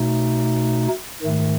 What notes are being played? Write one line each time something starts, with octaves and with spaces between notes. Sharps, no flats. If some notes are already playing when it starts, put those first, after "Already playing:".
Already playing: B2 A3 D#4
G#2 D#3 A3